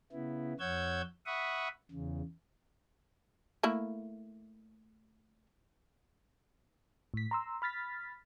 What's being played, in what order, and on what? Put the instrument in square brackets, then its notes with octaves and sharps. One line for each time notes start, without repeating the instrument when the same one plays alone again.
[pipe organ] C#3 B3 E4
F2 C#5 F#5 E6 G6 G#6
E5 F#5 B5 C#6 D#6
E2 C#3
[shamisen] A3 A#3 E4
[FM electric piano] A2 B6
A#5 C6 E6
B5 F6 A6 B6